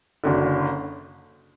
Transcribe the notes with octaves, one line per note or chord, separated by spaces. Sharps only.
F#1 F#2 D3